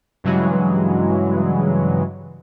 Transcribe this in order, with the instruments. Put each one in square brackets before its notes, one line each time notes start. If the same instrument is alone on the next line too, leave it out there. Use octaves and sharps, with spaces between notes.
[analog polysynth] G2 C#3 E3 F#3 G#3